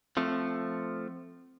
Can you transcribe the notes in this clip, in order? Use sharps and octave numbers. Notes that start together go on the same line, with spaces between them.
F3 A3 C4